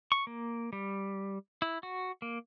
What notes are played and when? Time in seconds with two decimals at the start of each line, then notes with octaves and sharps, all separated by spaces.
0.12 C#6
0.27 A#3
0.73 G3
1.62 E4
1.83 F#4
2.22 A#3